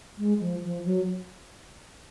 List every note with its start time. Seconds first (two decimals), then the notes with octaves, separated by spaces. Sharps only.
0.18 G#3
0.40 F3
0.63 F3
0.85 F#3